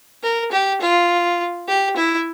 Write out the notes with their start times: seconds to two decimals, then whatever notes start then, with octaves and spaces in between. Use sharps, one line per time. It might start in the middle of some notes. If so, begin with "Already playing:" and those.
0.23 A#4
0.52 G4
0.81 F4
1.68 G4
1.97 E4